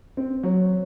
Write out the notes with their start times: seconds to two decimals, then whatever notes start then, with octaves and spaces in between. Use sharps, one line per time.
0.17 C4
0.44 F#3